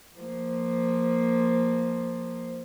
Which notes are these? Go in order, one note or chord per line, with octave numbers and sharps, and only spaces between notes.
F3 A#3